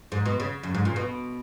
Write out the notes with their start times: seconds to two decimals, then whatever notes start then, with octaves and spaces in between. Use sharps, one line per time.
0.12 G#2
0.26 B2
0.40 C#3
0.63 F#2
0.75 G#2
0.85 A#2
0.96 B2